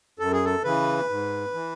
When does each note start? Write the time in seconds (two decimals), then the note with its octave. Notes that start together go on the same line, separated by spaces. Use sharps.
0.19 F#2 A4
0.32 G#4
0.45 A4
0.64 C#3 E3 B4
1.09 G#2
1.54 E3